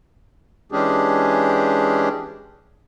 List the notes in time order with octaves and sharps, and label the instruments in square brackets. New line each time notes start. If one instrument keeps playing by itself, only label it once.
[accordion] E3 G#3 C#4 D4 G4 G#4